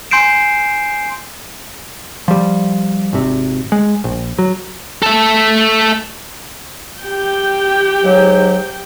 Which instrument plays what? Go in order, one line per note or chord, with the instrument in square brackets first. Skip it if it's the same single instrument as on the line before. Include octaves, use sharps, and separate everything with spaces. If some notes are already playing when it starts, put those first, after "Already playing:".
[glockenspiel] G#5 C6 G6 C7 D7 E7
[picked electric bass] F3 G3
G#1 C3
G#3
A#1
F#3
[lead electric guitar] A4 E5
[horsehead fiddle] G4 G5
[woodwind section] G#2 F#3